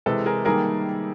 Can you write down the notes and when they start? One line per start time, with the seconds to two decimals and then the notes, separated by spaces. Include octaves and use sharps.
0.06 C3 E3 G#3 A4 B4
0.26 G#4 A#4
0.45 D#3 G3 A#3 G#4 A#4